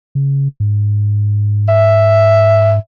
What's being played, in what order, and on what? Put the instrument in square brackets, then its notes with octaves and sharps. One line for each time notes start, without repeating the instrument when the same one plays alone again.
[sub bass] C#3
G#2
[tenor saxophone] E5